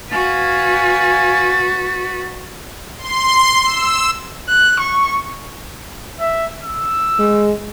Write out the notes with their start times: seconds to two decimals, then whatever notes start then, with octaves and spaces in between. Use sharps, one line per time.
0.11 F#4 B4 F5 G#5 A6
2.98 C6
3.65 E6
4.49 F#6
4.80 C#6
6.20 E5
6.63 E6
7.19 G#3